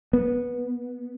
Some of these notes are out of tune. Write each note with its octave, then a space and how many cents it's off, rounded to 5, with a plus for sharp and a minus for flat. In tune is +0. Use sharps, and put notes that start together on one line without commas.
B3 -15